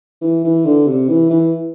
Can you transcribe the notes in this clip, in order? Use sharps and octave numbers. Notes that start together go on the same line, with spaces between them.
E3
E3
D3
C3
E3
E3